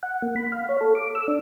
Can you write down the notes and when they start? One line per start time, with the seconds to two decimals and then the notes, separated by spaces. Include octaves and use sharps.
0.03 F#5
0.22 A#3
0.36 B5
0.52 F5
0.69 C#5
0.81 A4
0.95 D6
1.15 E6
1.28 D4